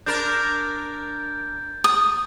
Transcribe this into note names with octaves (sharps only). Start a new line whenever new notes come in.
D4 A#4 G6 A6
D#6